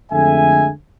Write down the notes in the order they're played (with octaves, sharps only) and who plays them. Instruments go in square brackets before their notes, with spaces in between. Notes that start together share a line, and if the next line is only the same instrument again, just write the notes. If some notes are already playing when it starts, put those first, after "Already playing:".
[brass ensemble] F2 D3 G#3 A3 E5 G#5